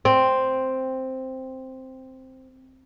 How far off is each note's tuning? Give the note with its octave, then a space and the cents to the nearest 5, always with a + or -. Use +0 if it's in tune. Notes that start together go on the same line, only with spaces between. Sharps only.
C4 +0